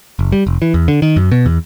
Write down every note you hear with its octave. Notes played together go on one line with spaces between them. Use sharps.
F#1
G3
F1
E3
E2
D3
D#3
F#2
B2
E2